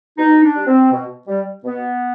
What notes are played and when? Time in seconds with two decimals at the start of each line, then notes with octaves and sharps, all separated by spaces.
0.18 B2 D#4
0.43 D4
0.56 G3
0.67 C4
0.92 B2
1.28 G3
1.64 B2 B3